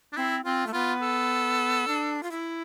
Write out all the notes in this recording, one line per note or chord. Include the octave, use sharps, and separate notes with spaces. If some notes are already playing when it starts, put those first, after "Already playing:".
D4
C4 E4
C4 F4
A3
B3 F4
A4
D4
F4
E4